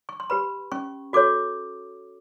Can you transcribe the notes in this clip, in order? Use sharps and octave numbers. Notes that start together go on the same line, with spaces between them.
C#6
C6
G4 B4 B5
C#4 C#6
F#4 A4 C#5 D6